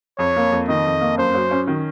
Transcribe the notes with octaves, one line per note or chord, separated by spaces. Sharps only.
F2 C#5
A#3
F2
D#3 D#5
F2
A#3
F#2 C5
F#3
C#4
D#3